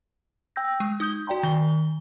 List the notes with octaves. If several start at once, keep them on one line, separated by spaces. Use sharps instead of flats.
G5 E6 G6 A#6
G#3
D#4 D#6 G6 G7
F#4 D5 G5 A#5 C6
D#3 G7